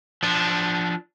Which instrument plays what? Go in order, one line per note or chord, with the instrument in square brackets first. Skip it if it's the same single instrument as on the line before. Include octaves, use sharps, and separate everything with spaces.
[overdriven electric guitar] F3 D4